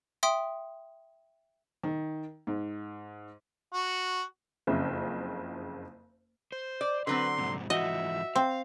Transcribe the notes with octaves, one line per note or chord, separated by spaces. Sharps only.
E5 G5 C6 D#6
D#3
G#2
F#4
F#1 F2 C#3 E5
C5
D5
D3 F#3 C4 B4 C6
F2 G#2 C3
G#2 E3 F3 F#4 D#5 E5
C4 F5